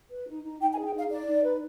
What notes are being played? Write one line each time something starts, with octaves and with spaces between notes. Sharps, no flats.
B4
D#4
D#4
D#4 G5
G#5
G#4
G5
D#4 F5
D#4 D5
D#4
B4